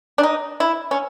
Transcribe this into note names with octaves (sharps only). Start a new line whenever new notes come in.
D4
D#4
E4
C#4